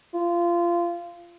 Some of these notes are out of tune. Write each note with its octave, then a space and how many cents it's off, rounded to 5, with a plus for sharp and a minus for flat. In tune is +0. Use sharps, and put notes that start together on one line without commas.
F4 -20